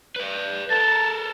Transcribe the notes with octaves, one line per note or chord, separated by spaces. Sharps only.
B4 D5
A4 A#4 A5